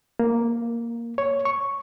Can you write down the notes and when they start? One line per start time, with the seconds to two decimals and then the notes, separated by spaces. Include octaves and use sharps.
0.19 A#3
1.18 C#5
1.45 C#6